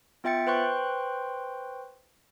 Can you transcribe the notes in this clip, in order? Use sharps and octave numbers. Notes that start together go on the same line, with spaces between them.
B3 F4 E5 G5 A6 C#7
B4 C5 G5 C6 C#6 F#6